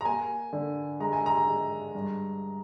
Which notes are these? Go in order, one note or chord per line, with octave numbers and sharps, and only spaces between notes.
A#5
A#3 G#5
D3
G#3 A#5
G#5
A#5
G#3
G2